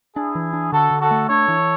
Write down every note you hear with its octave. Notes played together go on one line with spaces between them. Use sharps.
D4 E4 G#4
E3
D4
D3 F#4 A4
D3
F#4 A4
A3
D4 A4 C#5
E3